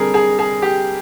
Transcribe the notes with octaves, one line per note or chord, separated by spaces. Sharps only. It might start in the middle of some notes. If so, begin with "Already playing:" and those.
Already playing: D3 G3 C4 G#4 A#4
G#4
G#4
G4